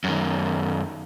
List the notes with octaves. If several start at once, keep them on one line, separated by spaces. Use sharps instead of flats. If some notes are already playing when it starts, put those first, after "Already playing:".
F#2 D#3